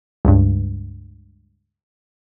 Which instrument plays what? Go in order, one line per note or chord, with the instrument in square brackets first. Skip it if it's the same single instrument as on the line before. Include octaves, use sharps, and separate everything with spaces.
[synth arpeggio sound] C#2 G2